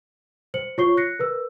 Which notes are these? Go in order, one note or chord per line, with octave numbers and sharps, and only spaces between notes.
C5 C#7 F#7
F4 C#5 C#6 C7 G7
F#6 A#6 C7 C#7
A#4 B4 E6